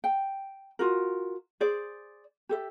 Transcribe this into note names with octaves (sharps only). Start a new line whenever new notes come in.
G5
F4 F#4 A#4
G#4 C5 D5
G4 A4 E5